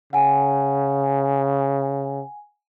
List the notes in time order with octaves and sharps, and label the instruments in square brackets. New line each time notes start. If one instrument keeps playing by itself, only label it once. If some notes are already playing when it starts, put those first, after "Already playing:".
[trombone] C#3 [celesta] F#5 G#5